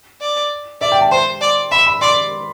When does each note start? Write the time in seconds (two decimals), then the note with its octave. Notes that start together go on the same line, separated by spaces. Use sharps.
0.21 D5
0.81 D5 E5
0.92 G5
1.01 A5
1.11 C5 C6
1.41 D5
1.71 E5 B5
1.86 B5
2.01 D5 C6